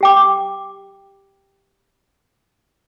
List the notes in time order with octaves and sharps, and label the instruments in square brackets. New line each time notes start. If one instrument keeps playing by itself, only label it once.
[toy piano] G4 G5 D6